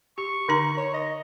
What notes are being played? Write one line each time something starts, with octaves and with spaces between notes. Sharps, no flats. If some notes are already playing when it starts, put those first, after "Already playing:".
G4 C#6
D3 D#4 A#5
C#5
D#5